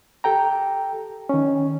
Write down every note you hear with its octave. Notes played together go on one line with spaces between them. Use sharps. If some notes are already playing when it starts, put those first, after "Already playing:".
G4 A4 G5 A#5
D#3 C#4